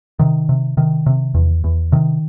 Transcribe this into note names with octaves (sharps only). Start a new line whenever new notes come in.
C3 D#3
C3
C3 D#3
C3
E2
E2
C3 D#3